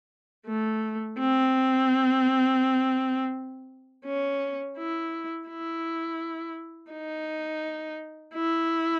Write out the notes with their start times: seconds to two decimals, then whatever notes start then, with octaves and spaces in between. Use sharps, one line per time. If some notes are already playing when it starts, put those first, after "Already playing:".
0.48 A3
1.19 C4
4.06 C#4
4.78 E4
5.48 E4
6.92 D#4
8.35 E4